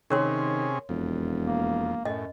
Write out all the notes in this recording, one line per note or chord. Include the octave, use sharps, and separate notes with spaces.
C3 D#3 C#4 G#4 A#4 C#5 C6
E1 F2
A#3
F#2 A2 D#5